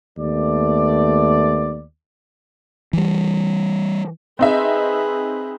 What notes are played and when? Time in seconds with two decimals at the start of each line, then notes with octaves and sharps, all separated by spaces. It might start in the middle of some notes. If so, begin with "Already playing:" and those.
0.18 D#2 A3 B3 D5
2.93 E3 G3
4.39 C4 D#4 G#4 B4 E5